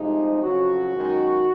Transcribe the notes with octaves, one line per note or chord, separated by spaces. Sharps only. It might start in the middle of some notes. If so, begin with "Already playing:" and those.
Already playing: C2 C3 F3 G#3 D#4
F2 C#3 F#3 F#4
F#2 D#3 G#3